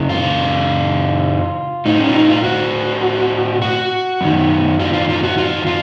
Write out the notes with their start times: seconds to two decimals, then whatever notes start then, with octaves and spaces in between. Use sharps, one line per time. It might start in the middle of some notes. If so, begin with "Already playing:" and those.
Already playing: F#2 C#3
0.09 F4
1.86 A2 D#4
2.00 C#4
2.09 F4
2.14 D#4
2.30 F4
2.44 F#4
3.62 F#4
4.21 F#2 D#3
4.79 F4
4.93 F4
5.09 F4
5.23 F#4
5.38 F4
5.67 F4